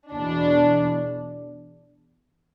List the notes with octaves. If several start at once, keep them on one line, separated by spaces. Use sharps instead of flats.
E2 B2 D4